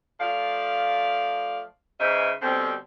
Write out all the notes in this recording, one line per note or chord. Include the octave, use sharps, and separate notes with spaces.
F3 A3 D5 F5
G#2 C#3 E3 C5 D#5 E5
B2 D3 G3 C4